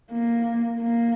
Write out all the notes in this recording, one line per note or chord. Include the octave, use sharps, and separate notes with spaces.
A#3
A#3